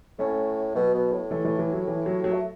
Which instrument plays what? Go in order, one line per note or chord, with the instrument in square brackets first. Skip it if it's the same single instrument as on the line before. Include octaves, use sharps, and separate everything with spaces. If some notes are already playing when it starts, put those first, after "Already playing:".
[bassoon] A2 [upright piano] A3 C#4
[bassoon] B2 [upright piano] F#3 B3
[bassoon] B2
A2
[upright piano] E3 A3
E3 A3
E3
F#3
E3
F#3
F#3
[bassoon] A3